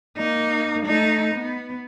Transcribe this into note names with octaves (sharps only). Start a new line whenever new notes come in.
A#3 D#4
A3 D#4
B3